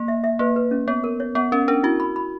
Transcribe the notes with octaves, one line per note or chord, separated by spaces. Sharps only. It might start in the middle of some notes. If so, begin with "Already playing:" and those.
Already playing: A#3
E5
E5
A#3 B4
B4
C#4
B3 C#5
A#4
C#5
B3 F#5
C#4 A#4
D4 A#4
E4 F#4
B5
B5